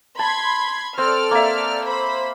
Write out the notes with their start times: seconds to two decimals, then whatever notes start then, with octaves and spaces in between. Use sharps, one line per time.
0.19 A5 B5 C6 G#6
0.98 C4 A4 D5 F6
1.31 A#3 E5
1.85 C5 B5